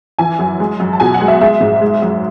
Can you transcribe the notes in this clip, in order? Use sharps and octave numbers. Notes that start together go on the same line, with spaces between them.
E3 G#5
F#2
G#3
F#2
A5
B2 G#5
F#5
G#3
E5
G#3 E5
G#2
G#3
F#2